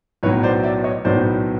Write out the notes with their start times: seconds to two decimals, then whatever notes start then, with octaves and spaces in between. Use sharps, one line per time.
0.23 B1 A2 F#3 B3 B4 C#5
0.43 C5 D5
0.63 D5 E5
0.84 C#5 D#5
1.05 B1 A2 F#3 B3 C5 D5